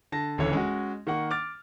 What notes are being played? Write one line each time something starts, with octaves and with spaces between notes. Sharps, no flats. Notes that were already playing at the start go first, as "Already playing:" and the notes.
D3 A5 A#6
D#1 D2 C#3 E3 A4 C#5
G#3 C#4 F#4
D#3 A#3 F#5 C#6
D6 F6 A6